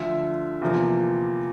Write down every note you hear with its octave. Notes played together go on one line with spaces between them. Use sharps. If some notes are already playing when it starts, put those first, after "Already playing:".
Already playing: D2 D3 F3 E5
E2 C3 F3 A#3